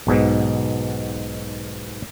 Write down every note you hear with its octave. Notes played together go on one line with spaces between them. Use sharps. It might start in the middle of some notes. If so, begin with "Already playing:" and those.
B1 G#2 B2